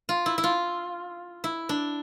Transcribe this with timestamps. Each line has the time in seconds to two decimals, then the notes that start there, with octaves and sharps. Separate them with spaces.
0.09 F4
0.26 E4
0.38 E4
0.44 F4
1.44 E4
1.69 D4